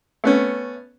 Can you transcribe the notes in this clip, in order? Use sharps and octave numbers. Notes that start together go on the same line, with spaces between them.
A3 B3 C#4